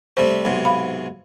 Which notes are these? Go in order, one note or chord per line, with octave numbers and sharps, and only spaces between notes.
C3 G3 A3 C5
B1 G#2 C3
F5 B5